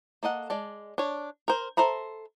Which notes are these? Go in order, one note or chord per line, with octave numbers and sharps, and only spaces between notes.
A#3 A4 D#5 F#5
G#3 D5 A5
D4 C#5
A#4 C5
A4 C5 E5 A#5 B5